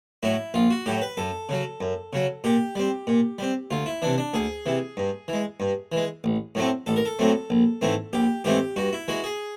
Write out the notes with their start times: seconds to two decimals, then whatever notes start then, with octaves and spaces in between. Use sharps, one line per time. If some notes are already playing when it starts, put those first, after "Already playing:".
0.23 A2 F#3 E4
0.54 A#1 F4
0.70 F#4
0.86 A2 F#3 G4
1.02 B4
1.17 F#2 A4
1.49 C#3 F#3
1.81 F#2
2.13 C#3 F#3
2.44 A#2 G4
2.76 G3 C4
3.07 A#2
3.38 G3 C4
3.71 D2 F4
3.86 E4
4.02 C3 E3 D4
4.18 D4
4.33 D2 G#4
4.66 C3 E3
4.97 G2
5.28 E3 G#3
5.60 G2
5.92 E3 G#3
6.24 A1
6.55 A2 F#3 A3 C4
6.86 A1 A4
6.96 A#4
7.05 A4
7.19 A2 F#3 A3 C4
7.50 A#1
7.81 G#2 E3 A3 C4
8.13 A#1 G4
8.44 G#2 E3 A3 C4 G4
8.76 G2 F#4
8.93 E4
9.08 E3 G#3 F#4
9.24 G#4